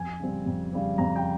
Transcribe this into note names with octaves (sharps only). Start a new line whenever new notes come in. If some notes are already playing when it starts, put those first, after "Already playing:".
Already playing: F2 G#5
C#3 G3 C4
F2
C#3 G3 C4
F2 A#5
G5